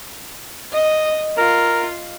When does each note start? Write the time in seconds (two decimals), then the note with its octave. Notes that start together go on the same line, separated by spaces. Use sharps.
0.73 D#5
1.38 F4 A#4